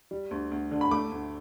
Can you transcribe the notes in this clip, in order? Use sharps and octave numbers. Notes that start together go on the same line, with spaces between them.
G3
D2
D2
D3
B5
A3 D6
D2